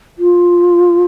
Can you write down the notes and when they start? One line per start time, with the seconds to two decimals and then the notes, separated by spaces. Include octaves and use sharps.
0.19 F4